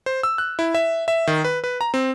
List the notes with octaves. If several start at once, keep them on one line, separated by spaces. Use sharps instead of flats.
C5
E6
F#6
E4
E5
E5
D#3
B4
B4
A#5
C4